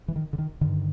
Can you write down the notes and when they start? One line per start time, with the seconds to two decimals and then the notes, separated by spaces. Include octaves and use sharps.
0.08 E3
0.16 D#3
0.33 D3
0.38 D#3
0.61 G2 D3 D#3